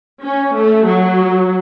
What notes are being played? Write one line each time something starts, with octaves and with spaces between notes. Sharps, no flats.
C#4
A3
F#3